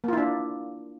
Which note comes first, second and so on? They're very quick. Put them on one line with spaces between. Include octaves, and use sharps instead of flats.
A#3 F4 E4 D4